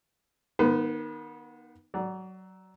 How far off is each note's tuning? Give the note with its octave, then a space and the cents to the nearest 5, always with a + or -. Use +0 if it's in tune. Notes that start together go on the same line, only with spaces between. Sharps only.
D#3 +0 B3 -30 B4 +40
F#3 +20 D5 +0